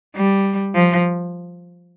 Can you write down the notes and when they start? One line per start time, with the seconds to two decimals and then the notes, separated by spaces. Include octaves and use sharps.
0.15 G3
0.75 F3